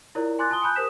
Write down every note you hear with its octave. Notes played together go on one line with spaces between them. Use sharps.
E4 F4 A#4 C#5 D5
G#5 C6 D6 F#6 A6
F4 A5 C6 D#6 G7
G#5 A5 B5 F#6 G6
G4 A#4 C5 D#6 B6 E7